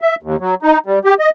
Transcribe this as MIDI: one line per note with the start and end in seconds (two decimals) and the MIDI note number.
0.01 0.15 76
0.23 0.36 39
0.40 0.55 54
0.63 0.79 63
0.86 0.99 55
1.05 1.14 67
1.19 1.30 75